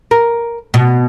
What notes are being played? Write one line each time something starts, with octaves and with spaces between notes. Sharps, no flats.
A#4
B2